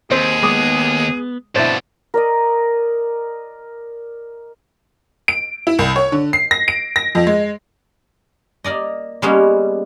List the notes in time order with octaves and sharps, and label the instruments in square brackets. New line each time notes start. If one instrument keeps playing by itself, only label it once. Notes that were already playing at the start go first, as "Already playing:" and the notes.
[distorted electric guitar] D#2 [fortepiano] C4 [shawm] G#4
[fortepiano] G#3 D6 D#6 [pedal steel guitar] B3
[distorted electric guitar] G2 B2 [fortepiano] C4 D4 E4 [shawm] A5
[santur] A#4 D5 D#5
[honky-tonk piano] D7
E4
C2
C#5
D3
C7
A#6
D7
A#6
F2
G#3
[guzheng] A#3 A#4 D5 D#5
G3 G#3 A#3 B3 C#4